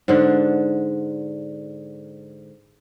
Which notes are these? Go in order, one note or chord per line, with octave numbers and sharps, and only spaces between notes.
G#2 D3 D4